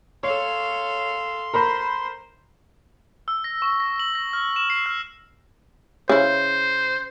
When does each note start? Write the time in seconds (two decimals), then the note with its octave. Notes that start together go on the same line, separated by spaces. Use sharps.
0.23 A4 C#5 F5 C6
1.54 A#4 C5 A#5 B5
3.28 E6
3.44 A#6
3.62 C#6
3.80 A#6
3.99 F#7
4.15 A#6
4.33 F6
4.56 E7
4.70 C7
4.86 F6
6.09 C#3 E4 C5